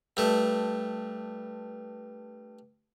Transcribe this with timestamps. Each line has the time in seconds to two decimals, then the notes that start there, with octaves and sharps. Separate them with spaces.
0.17 G2 A3